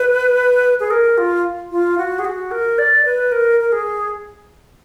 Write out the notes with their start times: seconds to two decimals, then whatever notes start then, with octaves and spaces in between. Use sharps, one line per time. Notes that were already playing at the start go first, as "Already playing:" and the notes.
Already playing: B4
0.80 G#4
0.91 A#4
1.18 F4
1.71 F4
1.98 F#4
2.19 G#4
2.25 F#4
2.51 A#4
2.78 D5
3.05 B4
3.32 A#4
3.60 A#4
3.72 G#4